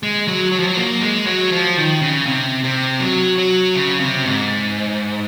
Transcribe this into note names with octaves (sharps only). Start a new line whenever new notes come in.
G#3
F#3
F#3
F3
F#3
A#3
G#3
F#3
F3
D#3
C#3
C3
C3
F#3
F#3
C#3
C3
G#2